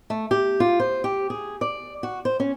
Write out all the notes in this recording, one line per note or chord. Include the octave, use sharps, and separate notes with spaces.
A3
G4
F4
C5
G4
G#4
D5
F#4
C5
C#4